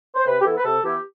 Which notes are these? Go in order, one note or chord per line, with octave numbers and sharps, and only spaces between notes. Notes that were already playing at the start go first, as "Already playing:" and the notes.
C5
C3 B4
G4
E3 B3 E4 A4
B4
C3 A4
E3 B3 E4 G4